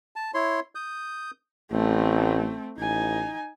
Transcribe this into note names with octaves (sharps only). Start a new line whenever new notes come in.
A5
E4 C#5 C6
D#6 G6
A1 A3 C4
A1 D#4 G#5